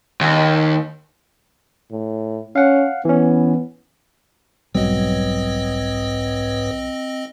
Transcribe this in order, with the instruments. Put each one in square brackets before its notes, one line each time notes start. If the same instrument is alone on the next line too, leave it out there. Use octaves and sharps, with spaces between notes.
[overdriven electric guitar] D#2
[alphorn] A2
[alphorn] C#4 [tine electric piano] F5 F#5
[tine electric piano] E3 C#4 [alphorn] B3
[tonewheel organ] F#1 G#2 B4 [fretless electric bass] B1 F#3 G3 [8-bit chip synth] C4 D#5